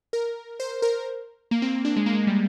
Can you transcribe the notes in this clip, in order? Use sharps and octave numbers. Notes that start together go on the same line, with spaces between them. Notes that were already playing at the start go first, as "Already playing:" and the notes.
A#4
C5
A#4
A#3
C4
D4
G#3
A#3
G#3
G3